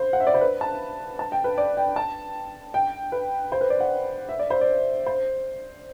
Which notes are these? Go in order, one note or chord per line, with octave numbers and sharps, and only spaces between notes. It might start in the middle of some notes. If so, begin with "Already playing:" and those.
Already playing: C5
F#5
E5
D5
C5
B4
A5
A5
G5
B4
D5
G5
A5
G5
B4
C5
B4
D5
F#5
E5
D5
C5
D5
C5